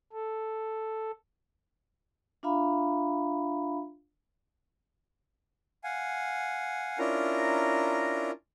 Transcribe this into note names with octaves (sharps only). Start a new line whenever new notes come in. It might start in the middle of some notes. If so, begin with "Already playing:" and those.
A4
D4 F4 E5 F5 A#5 B5
F5 F#5 G#5
C#4 D4 E4 F4 A#4 A#5